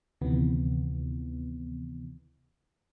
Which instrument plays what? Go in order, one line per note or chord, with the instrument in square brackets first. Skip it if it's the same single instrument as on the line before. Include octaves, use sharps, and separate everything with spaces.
[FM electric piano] D2 C3 D#3 E3 B3